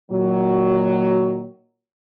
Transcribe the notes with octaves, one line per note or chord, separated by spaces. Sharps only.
A#2 D#3 F#3